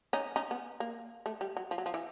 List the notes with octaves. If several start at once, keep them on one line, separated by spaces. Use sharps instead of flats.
C#4 D#4
C#4 D#4
B3
A#3
A3
G3
F#3
F3
F#3
F3
E3